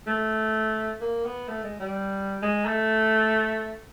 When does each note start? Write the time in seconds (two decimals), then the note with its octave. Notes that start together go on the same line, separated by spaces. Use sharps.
0.07 A3
1.01 A#3
1.25 B3
1.48 A3
1.64 G#3
1.80 G3
2.42 G#3
2.66 A3